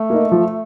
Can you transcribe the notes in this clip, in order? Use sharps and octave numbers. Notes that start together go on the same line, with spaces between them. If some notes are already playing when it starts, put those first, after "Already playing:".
Already playing: A3
A#3 D#4
F3